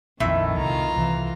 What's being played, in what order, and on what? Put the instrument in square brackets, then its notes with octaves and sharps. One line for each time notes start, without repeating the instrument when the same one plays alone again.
[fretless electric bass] A#1 F2 [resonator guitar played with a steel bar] A2 C4 E5 [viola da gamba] D#3
[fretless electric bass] C2 [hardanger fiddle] F4 A#5
[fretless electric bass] C2 [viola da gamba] E3